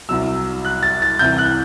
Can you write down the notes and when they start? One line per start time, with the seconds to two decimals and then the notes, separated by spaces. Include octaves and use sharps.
0.09 C2 C3 F#3 E6
0.65 F#6
0.83 A6
1.02 A6
1.19 C2 C3 E3 G6
1.38 F#6